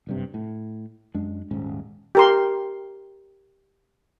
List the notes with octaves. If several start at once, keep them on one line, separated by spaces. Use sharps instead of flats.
F#1 G2 C3
A2
F#2 G#3 D4
D#1 G#2 C#4
G4 A#4 C6